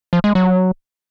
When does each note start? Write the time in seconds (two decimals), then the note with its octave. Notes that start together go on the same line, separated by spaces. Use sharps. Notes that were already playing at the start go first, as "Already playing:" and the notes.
0.13 F3
0.24 G#3
0.35 F#3